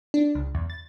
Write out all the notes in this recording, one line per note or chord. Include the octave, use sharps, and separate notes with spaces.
D4
C#2
E2
A6